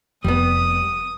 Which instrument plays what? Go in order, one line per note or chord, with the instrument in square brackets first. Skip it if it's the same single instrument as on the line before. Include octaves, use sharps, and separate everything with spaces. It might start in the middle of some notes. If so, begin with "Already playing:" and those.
[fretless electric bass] F1 [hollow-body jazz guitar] G3 B3 [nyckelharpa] D#6